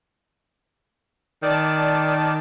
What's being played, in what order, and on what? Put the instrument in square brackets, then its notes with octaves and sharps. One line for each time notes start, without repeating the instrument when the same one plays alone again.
[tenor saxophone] D#3 [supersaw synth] D5 A5